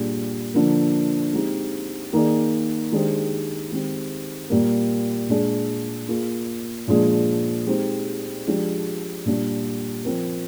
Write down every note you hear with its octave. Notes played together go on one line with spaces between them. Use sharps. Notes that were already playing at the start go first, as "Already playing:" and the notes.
Already playing: A#2 G3 D4 G#4
D3 F3 A#3
G#3 C4 D#4 G4
D#3 A#3 D#4 G#4 D5
D#3 G#3 D4 G4 C5
D#3 G#3 C4 G4
A#2 G3 A#3
A#2 G#3 D4 G#4
A#3 F4 G#4
A#2 F3 G#3 D4 G#4
G#3 C4 D#4 G4 C5
F3 G#3 D4 G4 D5
A#2 G3 D4
F3 C4 F4 A#4